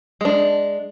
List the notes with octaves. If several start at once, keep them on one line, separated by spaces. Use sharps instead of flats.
G#3 D4